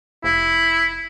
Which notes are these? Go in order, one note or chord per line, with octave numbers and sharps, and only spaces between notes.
F1 E4